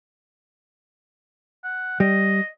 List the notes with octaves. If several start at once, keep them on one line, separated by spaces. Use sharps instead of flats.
F#5
G3 D#5